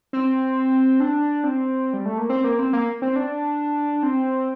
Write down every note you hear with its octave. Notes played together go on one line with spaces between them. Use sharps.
C4
D4
C4
G3
A3
A#3
C4
A#3
C4
A#3
C4
D4
C4